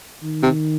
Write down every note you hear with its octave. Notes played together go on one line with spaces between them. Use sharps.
D#3
C3